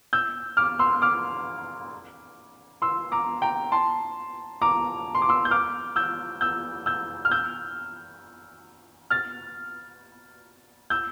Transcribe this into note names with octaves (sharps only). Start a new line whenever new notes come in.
E6 G6
D6 F6
C6 E6
D6 F6
C6 E6
A#5 D6
G5 A#5
A5 C6
A#5 D6
C6
D6
C6 E6
G6
D6 F6
E6 G6
E6 G6
E6 G6
F6
E6 G6
F6 A6
E6 G6